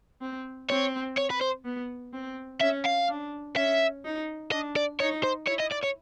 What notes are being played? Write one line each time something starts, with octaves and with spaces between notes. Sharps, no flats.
C4
C4 C#5
C#5
B4
C5
B3
C4
C#4 E5
F5
D4
C#4 E5
D#4
D4 D#5
D5
D#4 C#5
C5
E4 C#5
D#5
D5
C#5